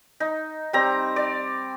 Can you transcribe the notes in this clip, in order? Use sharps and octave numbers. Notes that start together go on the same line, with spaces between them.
D#4
G3 C4 A#5
D5